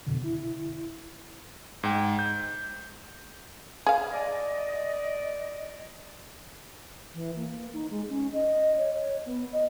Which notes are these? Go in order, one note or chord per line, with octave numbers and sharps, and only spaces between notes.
F2 B2 D3
E4
G#2 G5
G6
G#4 F5
D5 D#5
E3
A#3
D#4
G#3
C#4
D#5
C#5
C#5
B3
D#5